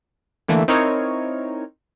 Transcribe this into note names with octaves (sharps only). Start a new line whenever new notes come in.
D3 E3 A3 A#3
C4 D#4 E4 A#4 C#5